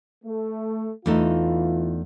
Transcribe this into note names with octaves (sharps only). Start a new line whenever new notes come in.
A3
E2 E3 A3 D#4 F4